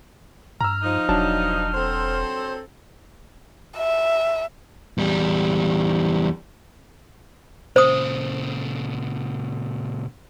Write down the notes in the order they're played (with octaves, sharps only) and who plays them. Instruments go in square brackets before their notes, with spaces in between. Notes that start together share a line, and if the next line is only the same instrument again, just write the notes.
[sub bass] G2 [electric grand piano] A#5 E6 [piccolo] F6
[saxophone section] F3 D#4
[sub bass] E1 [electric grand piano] F#3 D4 A5
[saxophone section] C4 A4 C5
[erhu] E5
[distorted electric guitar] E2 G3
[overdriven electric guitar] A#2 C#3 [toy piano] C5 D#6